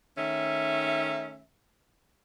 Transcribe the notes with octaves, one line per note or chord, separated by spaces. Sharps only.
D#3 A3 C#4 E5